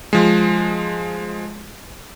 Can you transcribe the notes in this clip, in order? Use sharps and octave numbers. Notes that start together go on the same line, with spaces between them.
F3 G#3